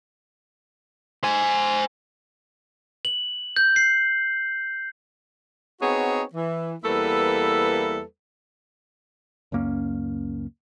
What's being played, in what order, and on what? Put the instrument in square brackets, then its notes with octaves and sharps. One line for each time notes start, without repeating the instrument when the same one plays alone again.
[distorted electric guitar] C5 G#5
[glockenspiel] F#7
G6
C7
[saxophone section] B3 C4 D#4 F#4 G#4 C#5
E3
E2 G3 A#3 E4 A4 B4
[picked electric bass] C#2 F#2 A#3 C#4